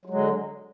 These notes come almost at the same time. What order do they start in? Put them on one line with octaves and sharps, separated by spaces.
F#3 G#3 D3